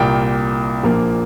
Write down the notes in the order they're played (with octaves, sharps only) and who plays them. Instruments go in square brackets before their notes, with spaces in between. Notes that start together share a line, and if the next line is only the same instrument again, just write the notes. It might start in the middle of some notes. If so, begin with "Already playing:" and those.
Already playing: [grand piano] C2 A#2 A#3 G5
A#1 A#2 F3 A#3